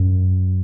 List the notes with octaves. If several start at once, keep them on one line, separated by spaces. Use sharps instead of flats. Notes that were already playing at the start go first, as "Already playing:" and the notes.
Already playing: F#2